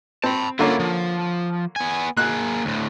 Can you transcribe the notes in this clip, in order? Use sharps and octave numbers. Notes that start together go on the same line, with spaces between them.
C4 A5 B5
D3 A#3 C#4 E4 F4
F3
B3 G#5
A#3 G#4 F#6
D2 A2